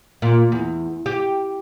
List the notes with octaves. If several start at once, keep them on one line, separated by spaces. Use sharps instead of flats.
A#2
E2
G4